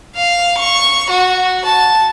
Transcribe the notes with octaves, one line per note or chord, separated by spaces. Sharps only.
F5
C#6
F#4
A5